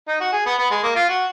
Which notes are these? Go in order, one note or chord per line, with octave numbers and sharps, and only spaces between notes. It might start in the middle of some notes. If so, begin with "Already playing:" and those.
D#4
F#4
G#4
B3
B3
G#3
A#3
F4
F#4